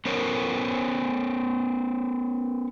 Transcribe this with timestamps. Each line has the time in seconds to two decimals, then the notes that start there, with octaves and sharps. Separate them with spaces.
0.05 B3 C#4 A#4 C5 C#5